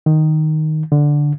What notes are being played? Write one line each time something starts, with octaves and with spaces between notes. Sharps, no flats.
D#3
D3